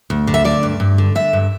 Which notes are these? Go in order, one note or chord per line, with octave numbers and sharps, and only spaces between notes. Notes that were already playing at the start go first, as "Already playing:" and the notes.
D2
D3
E5
D3 D5
G2
G2
D3
D3 E5
G2